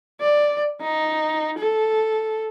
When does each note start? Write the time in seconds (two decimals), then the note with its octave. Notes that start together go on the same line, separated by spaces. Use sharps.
0.20 D5
0.81 D#4
1.58 A4